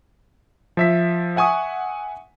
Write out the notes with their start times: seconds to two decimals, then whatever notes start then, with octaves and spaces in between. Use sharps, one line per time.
0.77 F3 E5 B6
1.36 E5 F#5 G#5 C#6 D#6